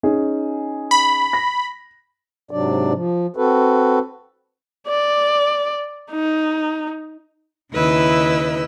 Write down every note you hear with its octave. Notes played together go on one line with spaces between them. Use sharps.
C#4 D#4 G#4
B5
A#6
G#2 C3 F#3 D4 D5
F3
C4 F#4 A4 B4
D5
D#4
D#2 C#3 E4 B4 D#5 E6